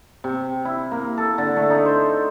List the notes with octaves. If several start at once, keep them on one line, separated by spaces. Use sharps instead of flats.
C3
E4
A#3
A4
D3
A3
D#4
C5